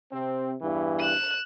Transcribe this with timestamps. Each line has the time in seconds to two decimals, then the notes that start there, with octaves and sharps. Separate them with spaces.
0.12 C3 C4
0.62 E2 G2 E3
0.99 F#6 E7